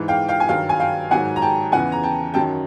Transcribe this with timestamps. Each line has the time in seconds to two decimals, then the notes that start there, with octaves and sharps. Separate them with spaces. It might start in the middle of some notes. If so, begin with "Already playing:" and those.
Already playing: G#2 E3
0.08 F5 G5
0.28 F5 G5
0.40 G#5
0.49 G2 D#3 F#3 F5 G5
0.69 G#5
0.80 F5 G5
1.11 G#2 D#3 F#3 F#5 G#5
1.36 A#5
1.42 G5 A5
1.72 E2 C#3 E3 F#5 G#5
1.92 A#5
2.03 G5 A5
2.34 F#2 D#3 F#3 G5 A5